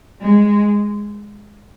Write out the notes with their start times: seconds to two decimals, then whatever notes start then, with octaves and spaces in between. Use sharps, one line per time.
0.21 G#3